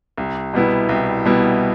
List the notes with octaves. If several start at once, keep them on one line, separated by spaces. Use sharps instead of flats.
C2
B2 G3 B3 E4
C2
B2 G3 B3 E4